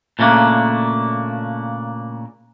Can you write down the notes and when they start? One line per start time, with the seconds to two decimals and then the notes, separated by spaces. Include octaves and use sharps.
0.19 A#2 C#3 A3 A#3 D4